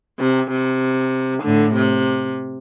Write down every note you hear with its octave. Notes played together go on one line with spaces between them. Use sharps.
C3
C3
A2 D3
C3